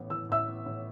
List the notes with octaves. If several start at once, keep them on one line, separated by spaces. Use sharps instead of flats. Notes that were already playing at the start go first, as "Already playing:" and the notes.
Already playing: A1 A2 E3 B3
E3 E6
A1 E5 E6
B3
A2